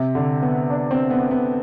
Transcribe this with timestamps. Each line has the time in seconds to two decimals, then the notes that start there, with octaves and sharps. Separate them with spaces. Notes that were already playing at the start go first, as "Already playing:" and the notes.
Already playing: C3
0.15 D3
0.42 B3
0.70 D4
0.91 C4
1.10 B3
1.31 B3